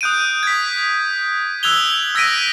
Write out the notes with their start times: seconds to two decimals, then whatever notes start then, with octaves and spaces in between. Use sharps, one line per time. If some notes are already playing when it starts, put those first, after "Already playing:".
0.01 D#6 F#6 G6 D7 D#7
0.43 G#6 B6
1.63 E6 F#6 G#6 F7 G7
2.15 E6 G#6 A#6 B6 D7 D#7